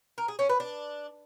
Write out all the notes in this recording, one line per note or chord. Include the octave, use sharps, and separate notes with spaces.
A#4
G#4
C#4
B4
D4